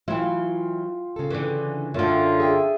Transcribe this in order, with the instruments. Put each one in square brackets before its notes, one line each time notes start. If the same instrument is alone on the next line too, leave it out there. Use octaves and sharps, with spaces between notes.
[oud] E3 E4 [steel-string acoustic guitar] F#3 [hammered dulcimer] F4 F5 G5
[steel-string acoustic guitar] C#3 A4
[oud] D3 E3
[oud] F#2 D3 [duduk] F4 [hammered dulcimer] E5
[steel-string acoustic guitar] G#4 G5 [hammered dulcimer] E5